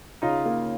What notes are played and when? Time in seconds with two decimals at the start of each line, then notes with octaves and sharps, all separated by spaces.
0.22 C#3 D#4 F4
0.46 A#3